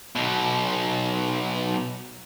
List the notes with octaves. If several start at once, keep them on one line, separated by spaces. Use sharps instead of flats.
B1 B2